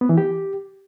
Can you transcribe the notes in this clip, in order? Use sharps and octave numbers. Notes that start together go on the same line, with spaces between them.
B3
E3
G4